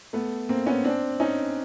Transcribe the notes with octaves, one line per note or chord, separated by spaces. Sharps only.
A3 B3
A#3 C4
B3 C#4
C4 D4
C#4 D#4